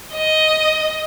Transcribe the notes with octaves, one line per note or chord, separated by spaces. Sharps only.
D#5